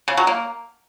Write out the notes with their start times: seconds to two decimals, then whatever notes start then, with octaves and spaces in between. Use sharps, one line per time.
0.08 C#3
0.17 F#3
0.27 A#3